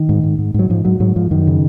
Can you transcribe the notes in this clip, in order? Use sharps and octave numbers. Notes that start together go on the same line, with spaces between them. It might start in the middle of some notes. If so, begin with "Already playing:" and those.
Already playing: D#3
G#2
G#2
G#2
G#2 F#3
G#2 F3
G#2 F#3
G#2 F#3
G#2 F3
F#2 D#3
C#3